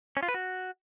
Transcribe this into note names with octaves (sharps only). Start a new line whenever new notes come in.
C#4
F4
B4
F#4